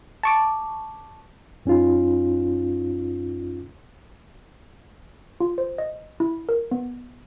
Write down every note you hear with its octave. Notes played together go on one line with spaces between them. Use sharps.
A5 C#6 D6
F#2 C#4 D#4 F4
F4
C5
D#5
E4
A#4
B3